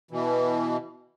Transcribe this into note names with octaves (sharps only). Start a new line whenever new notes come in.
B2 E3